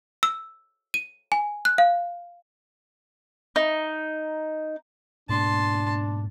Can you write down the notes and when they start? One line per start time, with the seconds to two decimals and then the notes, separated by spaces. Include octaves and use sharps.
0.23 E6
0.94 D#7
1.32 G#5
1.65 F#6
1.78 F5
3.56 D#4
5.29 G#2 B2 A#3 D4 A5 C6